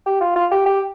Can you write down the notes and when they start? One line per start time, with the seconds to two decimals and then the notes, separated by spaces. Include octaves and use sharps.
0.06 G4
0.21 F4
0.36 F4
0.52 G4
0.66 G4